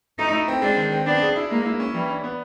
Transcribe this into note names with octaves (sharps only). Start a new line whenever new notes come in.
A3 D#4
E4
C4
G#3 D4
D#3
C4
B3 D4
G#4
E4
G#3 A#3
E4
C#4
E3 G3
D4
B3